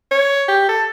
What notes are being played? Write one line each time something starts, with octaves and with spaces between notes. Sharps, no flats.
C#5
G4
A4